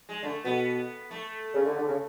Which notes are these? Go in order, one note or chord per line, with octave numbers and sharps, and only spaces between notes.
G#3
D3 A3
B2 B3
A3
C#3
D3
D3
C#3